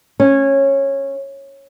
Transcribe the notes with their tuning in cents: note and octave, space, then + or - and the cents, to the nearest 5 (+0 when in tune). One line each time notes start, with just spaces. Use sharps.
C#4 -15